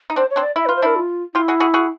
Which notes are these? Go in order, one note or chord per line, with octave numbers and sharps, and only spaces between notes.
D#4
C4 D4 C5
C#5
C4 D4
D5
E4 E5
B4
F4
C5
D4 E4 A#4
F4
E4 F4 G4
F#4 G#4
F#4 G#4
F#4 G#4